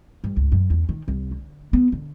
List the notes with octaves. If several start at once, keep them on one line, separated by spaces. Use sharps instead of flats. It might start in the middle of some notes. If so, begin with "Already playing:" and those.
G2
C#2
F#2
E2
D#3
C2
D3
B3
D3